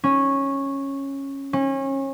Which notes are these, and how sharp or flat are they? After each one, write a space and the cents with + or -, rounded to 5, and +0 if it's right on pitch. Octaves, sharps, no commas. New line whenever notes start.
C#4 -10
C#4 -30